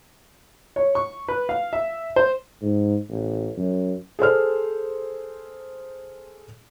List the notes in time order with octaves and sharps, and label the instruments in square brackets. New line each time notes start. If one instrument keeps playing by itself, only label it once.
[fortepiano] C#5
C#6
B4
F5
E5
C5
[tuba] G#2
A1
F#2
[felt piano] G#4 A4 C5 F6